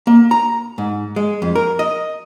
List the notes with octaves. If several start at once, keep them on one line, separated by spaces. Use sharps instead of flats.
A#3
A#5
G#2
G#3
F2
A#4
D#5